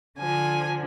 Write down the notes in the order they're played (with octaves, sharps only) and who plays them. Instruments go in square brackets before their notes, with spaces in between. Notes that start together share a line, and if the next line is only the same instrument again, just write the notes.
[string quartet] D3 F3 G#5